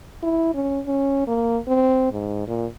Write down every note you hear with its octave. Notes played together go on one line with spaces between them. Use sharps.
E4
C#4
C#4
A#3
C4
G#2
A#2